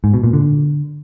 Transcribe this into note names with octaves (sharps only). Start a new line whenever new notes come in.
G#2
B2
A#2
D3